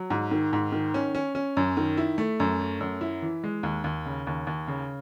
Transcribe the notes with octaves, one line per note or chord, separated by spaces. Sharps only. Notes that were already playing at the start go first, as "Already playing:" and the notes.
Already playing: F#3
G#2
D#3
G#2
D#3
C#4
C#4
C#4
F#2
D#3
E4
A3
F#2
A3
F#2
E4
E3
G#3
D#2
D#2
C#3
D#2
D#2
C#3